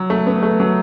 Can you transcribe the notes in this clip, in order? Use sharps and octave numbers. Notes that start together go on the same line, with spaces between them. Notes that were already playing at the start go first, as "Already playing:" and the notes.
Already playing: F#3
A3
B3
A3
F#3